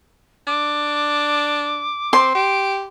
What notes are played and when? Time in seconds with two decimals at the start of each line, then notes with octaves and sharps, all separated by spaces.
0.47 D4 D6
2.13 C4 C6
2.35 G4 D7